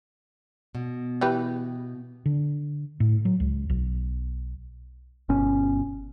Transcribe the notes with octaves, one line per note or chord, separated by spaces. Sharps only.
B2
E3 G4 B4
D3
A2
F#3
C#2
B1
G1 B2 C#4